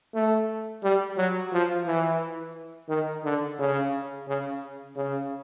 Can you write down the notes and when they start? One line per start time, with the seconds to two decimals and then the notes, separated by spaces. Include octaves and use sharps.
0.15 A3
0.83 G3
1.17 F#3
1.52 F3
1.87 E3
2.89 D#3
3.24 D3
3.59 C#3
4.27 C#3
4.96 C#3